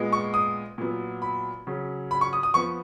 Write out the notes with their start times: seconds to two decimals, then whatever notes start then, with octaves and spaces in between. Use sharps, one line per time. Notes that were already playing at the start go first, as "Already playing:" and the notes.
Already playing: A#2 G#3 B3
0.13 C#6
0.34 D#6
0.78 A#2 F#3 B3
1.22 B5
1.67 C#3 F#3 C#4
2.11 B5
2.21 C#6
2.33 D#6
2.43 D#6
2.54 F3 B3 C#6